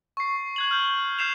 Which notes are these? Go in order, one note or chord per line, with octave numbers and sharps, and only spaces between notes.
C#6 C7
F#6 G#6 F#7
F6 G6
F6 G6 C7 E7 F7